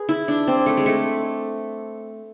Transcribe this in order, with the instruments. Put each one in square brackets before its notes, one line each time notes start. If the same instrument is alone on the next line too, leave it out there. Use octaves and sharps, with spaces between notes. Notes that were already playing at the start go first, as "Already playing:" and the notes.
Already playing: [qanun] G#4 B4
E4
D4
C4
A3
G#3
A3